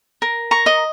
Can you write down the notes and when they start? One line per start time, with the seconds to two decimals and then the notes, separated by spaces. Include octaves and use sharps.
0.22 A#4
0.51 A#5 C#6
0.66 D#5